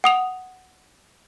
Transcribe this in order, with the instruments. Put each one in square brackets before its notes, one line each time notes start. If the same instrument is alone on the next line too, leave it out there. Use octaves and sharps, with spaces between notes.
[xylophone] F#5 D#6 F7